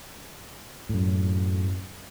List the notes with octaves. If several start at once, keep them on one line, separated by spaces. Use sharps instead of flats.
F#2 A2